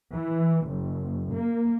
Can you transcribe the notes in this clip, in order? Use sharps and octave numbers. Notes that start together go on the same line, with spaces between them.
E3
F#1
A#3